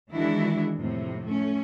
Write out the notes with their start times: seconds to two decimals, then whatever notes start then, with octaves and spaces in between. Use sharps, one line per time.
0.11 D#3 E3 G#3 D4 E4 F#4
0.76 F2 A2 C3
1.27 A3 C#4